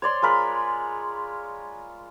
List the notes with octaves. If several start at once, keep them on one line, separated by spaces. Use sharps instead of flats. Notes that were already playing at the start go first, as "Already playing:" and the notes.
C#5 D5 C6
G#3 F4 A#4 B5